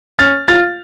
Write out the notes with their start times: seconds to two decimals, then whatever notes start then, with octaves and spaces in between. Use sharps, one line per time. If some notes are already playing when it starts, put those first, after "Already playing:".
0.19 C#4 F6 A6
0.48 F4 F6 A6